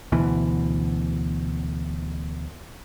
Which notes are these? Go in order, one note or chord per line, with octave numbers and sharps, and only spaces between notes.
D2 B2 E3